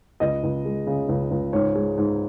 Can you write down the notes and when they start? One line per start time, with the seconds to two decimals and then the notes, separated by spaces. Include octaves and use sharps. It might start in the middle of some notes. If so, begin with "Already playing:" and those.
0.20 C#2 D#5
0.43 C#2
0.65 G#3
0.87 C#3
1.08 C#2
1.31 C#2
1.53 G#2 C#5
1.75 G#3
1.98 G#2